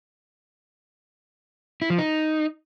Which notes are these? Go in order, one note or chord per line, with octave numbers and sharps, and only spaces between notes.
E4
F3
D#4